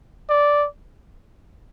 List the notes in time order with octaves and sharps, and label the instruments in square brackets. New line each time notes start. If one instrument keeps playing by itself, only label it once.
[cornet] D5